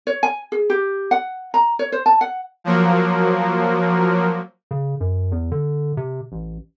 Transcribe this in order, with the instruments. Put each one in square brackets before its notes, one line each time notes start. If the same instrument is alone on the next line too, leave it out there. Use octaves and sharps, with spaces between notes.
[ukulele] C#5
G#5
G#4
G4
F#5
A#5
C#5
C5
A5
F#5
[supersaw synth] F3 F#3 A#3
[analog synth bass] C#3
F#2
E2
D3
C3
A1